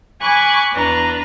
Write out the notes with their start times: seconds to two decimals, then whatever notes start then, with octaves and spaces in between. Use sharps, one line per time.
0.21 G#5 B5 C#6 D6 F#6
0.73 E2 D4 B4 A#5